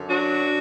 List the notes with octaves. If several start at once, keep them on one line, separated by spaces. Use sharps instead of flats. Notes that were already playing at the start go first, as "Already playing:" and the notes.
Already playing: F#2 D3
F#3 D4 F#4